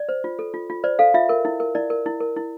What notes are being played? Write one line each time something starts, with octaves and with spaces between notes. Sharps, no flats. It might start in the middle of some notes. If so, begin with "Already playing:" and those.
Already playing: D5
C5
F4
A4
F4
F4
C5 D5
A4 F5
F4 E5
A#4
E4
A#4
E4 D5
A#4
E4
A#4
E4